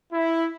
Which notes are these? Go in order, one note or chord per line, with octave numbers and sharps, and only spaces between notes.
E4